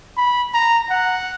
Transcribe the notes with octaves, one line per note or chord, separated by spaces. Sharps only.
B5
A#5
F#5